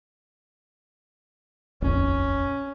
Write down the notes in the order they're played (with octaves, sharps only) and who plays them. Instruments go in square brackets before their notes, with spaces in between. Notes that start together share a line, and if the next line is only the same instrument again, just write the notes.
[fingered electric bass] D#1 A#1 F2 [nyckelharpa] C#4